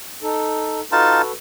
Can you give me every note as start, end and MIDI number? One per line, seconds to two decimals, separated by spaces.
0.23 0.80 63
0.23 0.80 69
0.92 1.22 63
0.92 1.22 65
0.92 1.32 66
0.92 1.32 69
0.92 1.32 71
0.92 1.22 81